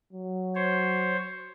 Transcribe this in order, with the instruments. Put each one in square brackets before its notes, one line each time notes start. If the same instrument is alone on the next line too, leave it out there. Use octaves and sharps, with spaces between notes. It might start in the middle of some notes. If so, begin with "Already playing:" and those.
[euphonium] F#3
[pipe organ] C5 C#5